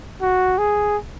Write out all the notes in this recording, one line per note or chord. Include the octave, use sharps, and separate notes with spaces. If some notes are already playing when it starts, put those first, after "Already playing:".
F#4
G#4